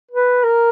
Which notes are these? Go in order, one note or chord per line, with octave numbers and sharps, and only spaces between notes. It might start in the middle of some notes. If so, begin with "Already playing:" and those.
B4
A#4